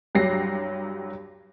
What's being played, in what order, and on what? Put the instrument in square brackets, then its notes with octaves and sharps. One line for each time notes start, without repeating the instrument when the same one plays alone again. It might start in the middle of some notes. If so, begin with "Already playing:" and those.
[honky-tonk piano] C2 G2 F#3 G4 A#6 C7